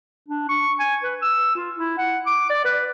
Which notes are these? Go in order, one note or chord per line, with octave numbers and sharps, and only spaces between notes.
D4
C#6
G#5
B4
E6
F4
E4
F#5
D6
D5
B4